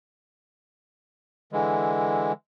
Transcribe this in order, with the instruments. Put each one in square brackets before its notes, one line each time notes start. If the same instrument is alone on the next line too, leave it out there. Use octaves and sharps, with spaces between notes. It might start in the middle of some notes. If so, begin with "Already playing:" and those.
[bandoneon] D3 E3 G#3